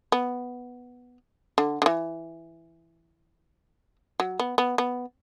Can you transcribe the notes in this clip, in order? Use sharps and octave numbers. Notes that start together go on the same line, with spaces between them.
B3
D3
D3
E3
F#3
B3
B3
B3